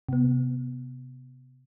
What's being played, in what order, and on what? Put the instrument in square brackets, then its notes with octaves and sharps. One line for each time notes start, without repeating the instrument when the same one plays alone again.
[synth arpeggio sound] C3 B3